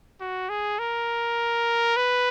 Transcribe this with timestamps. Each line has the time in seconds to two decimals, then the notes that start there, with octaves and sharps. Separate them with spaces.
0.21 F#4
0.50 G#4
0.79 A#4
1.97 B4